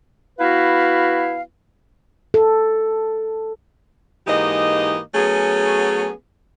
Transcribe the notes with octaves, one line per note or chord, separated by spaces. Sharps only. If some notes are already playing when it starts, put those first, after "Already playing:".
B3 E4 F#4 B4 F5
A4
G#2 E3 A#3 D#4 G4 D#5
F#3 A3 B3 C#4 G#4